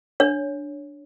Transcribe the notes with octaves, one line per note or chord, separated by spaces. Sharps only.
D4 C#5